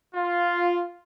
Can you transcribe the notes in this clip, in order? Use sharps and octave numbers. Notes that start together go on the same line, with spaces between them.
F4